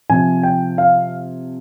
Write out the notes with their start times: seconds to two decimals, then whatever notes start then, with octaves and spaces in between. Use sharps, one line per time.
0.09 C3 F3 G#5
0.43 G5
0.78 F5